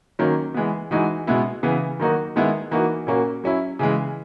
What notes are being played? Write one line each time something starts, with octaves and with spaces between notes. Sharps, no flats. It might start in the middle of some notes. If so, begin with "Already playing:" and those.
D#3 F#3 A#3 C#4
E3 G#3 B3
E3 G#3 D#4 F#4
B2 G#3 B3 E4
C#3 E3 B3
D#3 F#3 A#3 D#4 F#4
D#3 G#3 B3 E4
E3 A#3 D#4 F#4
A#2 A#3 C#4 F#4
F#3 C#4 E4
C#3 E3 G#3